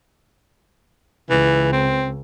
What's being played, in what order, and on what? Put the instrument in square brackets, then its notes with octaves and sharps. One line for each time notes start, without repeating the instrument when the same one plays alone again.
[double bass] C#2 [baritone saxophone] E3
[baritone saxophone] C4